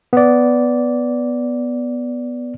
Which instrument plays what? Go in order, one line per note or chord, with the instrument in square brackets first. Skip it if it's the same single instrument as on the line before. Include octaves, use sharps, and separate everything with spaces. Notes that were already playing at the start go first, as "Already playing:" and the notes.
[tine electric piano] B3 D5